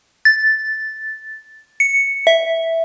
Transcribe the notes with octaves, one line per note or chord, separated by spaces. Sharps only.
A6
C#7
E5